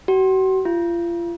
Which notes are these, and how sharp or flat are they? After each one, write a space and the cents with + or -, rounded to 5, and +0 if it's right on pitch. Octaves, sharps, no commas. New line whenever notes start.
F#4 +40
F4 -35